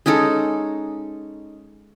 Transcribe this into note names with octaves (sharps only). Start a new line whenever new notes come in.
G#3 C#4 D#4 A4